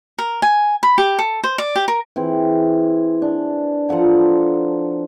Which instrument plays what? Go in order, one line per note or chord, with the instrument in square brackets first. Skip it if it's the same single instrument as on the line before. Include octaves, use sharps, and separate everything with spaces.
[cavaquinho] A#4
G#5
B5
G4
A4
C5
D5
G4
A#4
[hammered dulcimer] E3 C4 G#4
D4
F3 A4 F#5 A#5